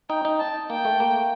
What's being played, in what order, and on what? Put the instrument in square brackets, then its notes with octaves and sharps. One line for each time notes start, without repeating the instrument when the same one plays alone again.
[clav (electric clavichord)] D#4 [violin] G5
[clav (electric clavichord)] D#4
[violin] A5
[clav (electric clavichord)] A#3 [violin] G5
[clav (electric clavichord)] A3
A#3